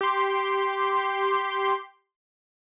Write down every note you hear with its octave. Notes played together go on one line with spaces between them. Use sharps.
G4 C6